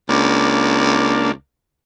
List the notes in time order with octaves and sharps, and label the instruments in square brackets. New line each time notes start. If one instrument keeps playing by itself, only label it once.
[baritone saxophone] C#2 [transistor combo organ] A#3 D4